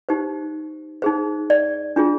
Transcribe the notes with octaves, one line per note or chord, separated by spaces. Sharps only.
D#4 G4 C5
D#4 G#4 C5
D5
D4 F4 G#4